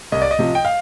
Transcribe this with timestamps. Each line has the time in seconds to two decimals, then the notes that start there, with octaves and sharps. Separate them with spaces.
0.12 C2 D#5
0.22 D5
0.31 D#5
0.39 C3 F3
0.55 G5
0.65 F5